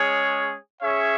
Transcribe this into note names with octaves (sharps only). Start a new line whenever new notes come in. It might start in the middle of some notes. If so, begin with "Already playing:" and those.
Already playing: G#3 C#4 G#4 C#5
C#4 G#4 C#5 E5